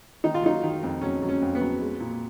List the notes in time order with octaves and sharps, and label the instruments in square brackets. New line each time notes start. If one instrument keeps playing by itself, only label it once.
[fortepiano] D#3 D#4
F4
F#3 D#4
D#3
F2
F#3 C#4
F#3
C#4
F2
B3
F#3
G#3
A#2